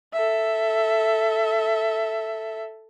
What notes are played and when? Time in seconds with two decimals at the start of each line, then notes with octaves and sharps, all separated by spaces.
0.13 A4 E5